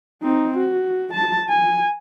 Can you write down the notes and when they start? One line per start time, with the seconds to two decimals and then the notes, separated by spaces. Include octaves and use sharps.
0.22 C4 D#4
0.58 F#4
1.14 A5
1.49 G#5